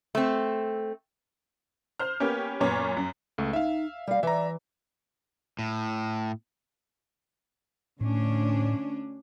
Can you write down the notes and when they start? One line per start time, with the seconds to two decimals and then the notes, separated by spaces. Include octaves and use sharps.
0.15 A3 C4
2.00 C5 F6
2.20 A#3 B3 C#4 G4
2.60 F#2 A#2 B3 C#4 C#5 D6
2.97 F#2
3.38 C#2 A3
3.53 D#4 E5 F5
4.07 G3 D5 F5
4.23 E3 D5 E5 A#5
5.59 A2
8.01 D2 A2 C#4 D4